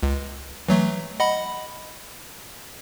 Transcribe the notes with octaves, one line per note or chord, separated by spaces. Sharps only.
C#2
E3 F#3 A3
D#5 F#5 B5